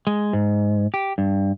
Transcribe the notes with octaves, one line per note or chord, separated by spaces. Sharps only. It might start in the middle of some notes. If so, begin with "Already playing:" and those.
G#3
G#2
G4
G2